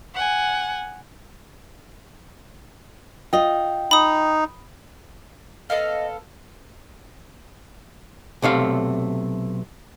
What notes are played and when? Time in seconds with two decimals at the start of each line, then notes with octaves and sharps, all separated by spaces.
0.14 F#5 G#5
3.33 F4 D#5 G5
3.91 D#4 B5 D#6
5.70 B3 A4 D#5 F5
8.42 B1 C3 A3 F5